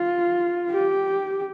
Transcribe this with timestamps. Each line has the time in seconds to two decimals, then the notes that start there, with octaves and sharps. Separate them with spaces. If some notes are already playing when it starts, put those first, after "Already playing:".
Already playing: F4
0.71 G4